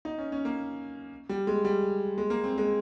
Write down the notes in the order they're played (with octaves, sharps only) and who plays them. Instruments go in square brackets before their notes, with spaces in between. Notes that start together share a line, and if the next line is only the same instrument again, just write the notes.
[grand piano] D#4
C#4
C#4
A#3
G3
G#3
G3
G#3
A#3
C4
G#3